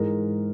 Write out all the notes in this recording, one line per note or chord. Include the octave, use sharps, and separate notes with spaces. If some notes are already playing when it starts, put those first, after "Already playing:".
Already playing: G#2 E3 G#3 A#4